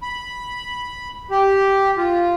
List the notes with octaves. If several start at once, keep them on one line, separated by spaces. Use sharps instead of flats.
B5
G4
F4